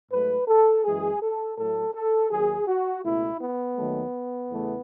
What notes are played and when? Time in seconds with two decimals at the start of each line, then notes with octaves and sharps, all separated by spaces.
0.11 G#2 F#3 A3 B4
0.48 A4
0.84 F#2 E3 G#3 G#4
1.22 A4
1.57 A2 F#3 A3 A4
1.94 A4
2.30 D#2 D#3 F#3 G#4
2.68 F#4
3.04 C#2 B2 A3 E4
3.41 B3
3.77 D#2 D#3 F#3 A3
4.51 E2 C#3 E3 A3